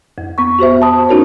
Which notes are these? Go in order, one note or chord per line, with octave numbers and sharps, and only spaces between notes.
F2
B3 C#6
F#4 G4 C5 E5
A5 B5 D#6
C#4 D#4 F#4 A#4 C#5